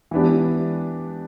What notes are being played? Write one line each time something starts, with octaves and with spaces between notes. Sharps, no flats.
E3 B3 D4 G4